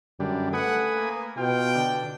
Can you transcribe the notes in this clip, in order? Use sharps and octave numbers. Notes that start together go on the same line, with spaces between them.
F#2 D3 G3
A3 B4 F#5 G#5 D#6
A#3
B2 F4 G5
D3